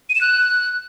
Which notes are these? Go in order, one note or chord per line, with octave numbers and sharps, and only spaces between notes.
D#7
E7
F#6